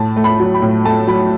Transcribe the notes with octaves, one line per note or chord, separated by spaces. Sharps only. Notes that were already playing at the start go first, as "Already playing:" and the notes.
Already playing: A2 A5
A3
B5
F#3
B5
A2
A3 A5
F#3 B5